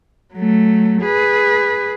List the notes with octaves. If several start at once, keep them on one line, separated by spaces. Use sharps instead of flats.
F#3 A3
G#4 B4